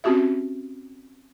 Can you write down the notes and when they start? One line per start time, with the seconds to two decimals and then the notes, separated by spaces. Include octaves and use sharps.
0.04 C4 C#4 F#4 G4 E5